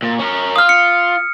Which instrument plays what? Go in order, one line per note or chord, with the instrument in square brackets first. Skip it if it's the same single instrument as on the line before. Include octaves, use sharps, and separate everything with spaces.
[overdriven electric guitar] A#2
C#4 A#4
[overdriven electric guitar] F4 [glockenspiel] D#6 F6
[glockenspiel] C#7